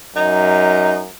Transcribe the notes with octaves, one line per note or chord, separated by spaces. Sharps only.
F#2 D#4